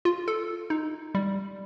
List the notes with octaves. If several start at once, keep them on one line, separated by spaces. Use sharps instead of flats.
F4
A4
D#4
G3